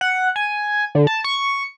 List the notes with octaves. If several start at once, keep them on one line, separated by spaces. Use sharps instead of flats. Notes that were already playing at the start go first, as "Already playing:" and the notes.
F#5
G#5
D3
A5
C#6